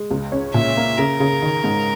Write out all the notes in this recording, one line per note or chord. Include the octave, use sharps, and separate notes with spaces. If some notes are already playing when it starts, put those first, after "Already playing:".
Already playing: G#3
C#2
C#4
A#2 E5
A#3
C#3 A#4
C#3
D#3
G#2